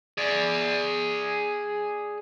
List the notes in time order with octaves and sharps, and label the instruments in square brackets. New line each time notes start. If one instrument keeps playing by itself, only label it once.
[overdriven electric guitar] G#4 D5